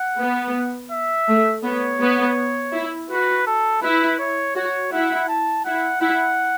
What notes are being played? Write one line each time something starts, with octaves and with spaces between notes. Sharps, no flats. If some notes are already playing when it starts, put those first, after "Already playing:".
Already playing: F#5
B3
E5
A3
B3 C#5
B3
E4
F#4 B4
A4
E4 B4
C#5
F#4 C#5
E4 F#5
A5
E4 F#5
E4 F#5